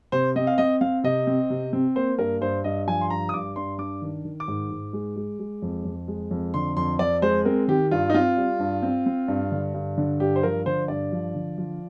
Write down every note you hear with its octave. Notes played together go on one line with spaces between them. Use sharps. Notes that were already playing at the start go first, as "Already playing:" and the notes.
C3 C5
C4 D#5
F5
C4 D#5
C4 F5
C3 D#5
C4
C3
C4
A#3 C5
G2 A#4
G2 C5
G2 D#5
F3 G#5
C6
G2 A#5
D#6
G2 D6
G2 C6
D4 D6
D#3
D#3
D6
G#2
G#2
G#3
G#3
G#3
F2
F2
G#3
F2
D3 C6
F2 C6
F2 D5
G#3 C5
C4 A#4
D#3 G4
G2 F4
D#4
C4 F4
G3
G2
C4
C4
G2
D3
G2
D3
G2 G4
C5
F3 A#4
D3 C5
G2 D5
F3
D3
F3